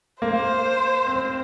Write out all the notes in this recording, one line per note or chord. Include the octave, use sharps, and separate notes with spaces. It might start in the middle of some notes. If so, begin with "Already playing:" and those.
A#3 C5
C4